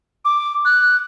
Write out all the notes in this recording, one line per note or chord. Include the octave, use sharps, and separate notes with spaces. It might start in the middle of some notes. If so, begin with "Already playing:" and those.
D6
F#6